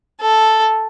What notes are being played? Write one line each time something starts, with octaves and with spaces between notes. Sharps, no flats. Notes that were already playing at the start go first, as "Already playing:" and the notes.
A4